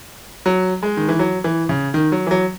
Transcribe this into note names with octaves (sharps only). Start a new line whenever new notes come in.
F#3
G#3
D#3
E3
F#3
E3
C#3
D#3
F#3
E3
F#3